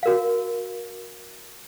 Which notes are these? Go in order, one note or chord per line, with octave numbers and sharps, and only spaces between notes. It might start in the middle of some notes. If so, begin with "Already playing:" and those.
F#4 A#4 F5